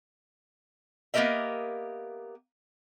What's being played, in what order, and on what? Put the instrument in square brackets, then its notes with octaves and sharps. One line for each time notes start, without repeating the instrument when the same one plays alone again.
[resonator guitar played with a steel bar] A#3 B3 G4 A#4 D#5 E5